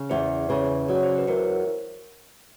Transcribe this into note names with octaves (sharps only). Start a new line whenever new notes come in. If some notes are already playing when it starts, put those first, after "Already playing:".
Already playing: C#3
E2 C5 D5
C#3 B4 C#5
F#3 D5
C#5
C5 D5
B4
E2 A#4 C5